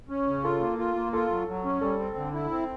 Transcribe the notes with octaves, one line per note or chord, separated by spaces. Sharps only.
C#4
C#3
F4 A4
A#3
F4
A#3
F4 A4
F#3
F#3
C#4
G3 A4
C4
D3
E4
C4